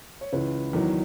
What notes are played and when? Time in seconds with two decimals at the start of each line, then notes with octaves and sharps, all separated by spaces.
0.21 C#5
0.32 C#2 C#3 E3 B4
0.73 E2 D#3 F#3